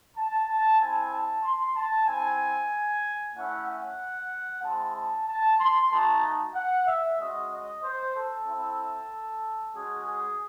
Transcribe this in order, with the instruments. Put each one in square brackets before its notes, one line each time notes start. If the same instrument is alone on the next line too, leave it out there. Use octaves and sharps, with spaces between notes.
[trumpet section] A5
A5
C4 E4 G#5
A5
C6
A5
C4 E4 G#5
A3 C#4 E4 F#5
F#5
G#3 C4 E4 A5
A5
A5
C6
A3 D#4 F#4 A5
F#5
E5
G#3 C#4 F#4 D#5
D#5
C5
A4
C4 E4
G#3 C#4 F#4 G#4
G#4